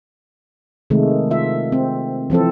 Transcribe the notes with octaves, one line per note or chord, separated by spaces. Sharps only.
C3 D#3 G#3 A3
F4 E5
C4
E3 F3 C4 A4